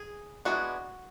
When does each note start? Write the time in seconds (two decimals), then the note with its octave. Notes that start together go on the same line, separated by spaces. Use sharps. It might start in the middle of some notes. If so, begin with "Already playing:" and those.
Already playing: G#4
0.45 E3 G#3 B3 D4 F#4